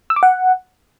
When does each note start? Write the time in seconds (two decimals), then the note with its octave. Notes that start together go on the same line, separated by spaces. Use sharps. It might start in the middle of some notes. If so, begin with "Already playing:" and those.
0.10 E6
0.16 D6
0.23 F#5